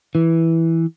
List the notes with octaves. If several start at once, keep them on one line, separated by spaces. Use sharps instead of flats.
E3